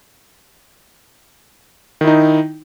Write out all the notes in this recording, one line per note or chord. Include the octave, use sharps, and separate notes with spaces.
D#3 D#4 E4